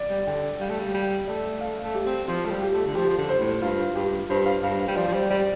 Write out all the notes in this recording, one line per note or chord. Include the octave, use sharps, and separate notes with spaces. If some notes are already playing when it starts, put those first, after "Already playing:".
Already playing: D5
G3
D3 G5
G3 F5
A3
G3
G3 G5
A3 D5
A3 F5
A3
G4
C4
F3 F4
A3
G3
G4
A3
D3
F3 G4
F3
D3
C5
A2
G2 F4
G2 G4
G2 C5
F5
G2 F5
F5
G3
F3 D5
F3
G3 C5
G3 D5